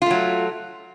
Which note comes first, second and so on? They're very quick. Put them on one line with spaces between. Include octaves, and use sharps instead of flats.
F4 A3 F#3